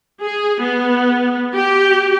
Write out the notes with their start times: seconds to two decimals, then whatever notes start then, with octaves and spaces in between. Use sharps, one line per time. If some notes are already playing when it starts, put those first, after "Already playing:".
0.21 G#4
0.62 B3
1.54 G4